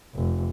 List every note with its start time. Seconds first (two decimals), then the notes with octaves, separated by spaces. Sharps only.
0.14 F1